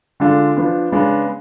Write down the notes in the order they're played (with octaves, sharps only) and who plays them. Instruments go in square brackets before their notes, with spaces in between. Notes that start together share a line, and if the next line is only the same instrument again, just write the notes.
[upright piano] D3 G#3 D4 F4
F3 B3 D4
C#3 G#3 B3 D4